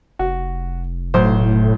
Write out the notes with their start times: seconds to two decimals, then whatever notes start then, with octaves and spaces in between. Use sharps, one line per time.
0.19 F1 F#4
1.14 B1 A2 C5